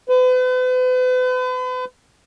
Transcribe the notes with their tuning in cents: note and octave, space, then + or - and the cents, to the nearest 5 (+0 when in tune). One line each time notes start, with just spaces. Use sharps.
B4 +40